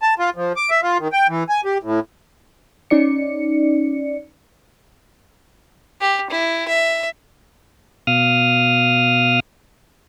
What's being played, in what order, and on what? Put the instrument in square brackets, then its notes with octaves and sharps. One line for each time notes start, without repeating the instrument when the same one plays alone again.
[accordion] A5
F4
F3
D6
E5
F4
D#3
G5
E3
G#5
G4
A2
[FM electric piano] C#4 D#4 D5 C#7
[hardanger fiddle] G4
E4
E5
[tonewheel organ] B2 F5 D#6 F6